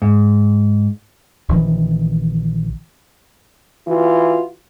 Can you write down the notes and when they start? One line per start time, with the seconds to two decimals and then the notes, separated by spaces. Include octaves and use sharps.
0.02 G#2
1.49 A#1 D#3 E3
3.87 E3 F4 F#4